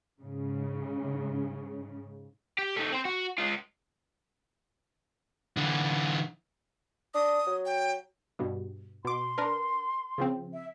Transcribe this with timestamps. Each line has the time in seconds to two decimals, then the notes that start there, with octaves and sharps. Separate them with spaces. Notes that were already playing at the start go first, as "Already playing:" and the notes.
0.21 G#2 C#3
2.59 G4
2.77 A3 D#4
2.92 C4 C5
3.05 F#4
3.38 G#3 F4
5.57 D3 E3
7.14 D4 D#6
7.47 F#3
7.66 G5
8.39 G2 B2
9.05 B2 C6 D6
9.38 D4 A#4 B4
10.18 C#3 F3 C4
10.53 E5